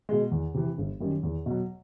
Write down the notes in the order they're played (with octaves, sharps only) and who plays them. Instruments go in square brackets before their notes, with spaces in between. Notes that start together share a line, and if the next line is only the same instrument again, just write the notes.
[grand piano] B2 G#3
E2
C3 E3
G1
F#2 D#3 G3
E2
B2 F#3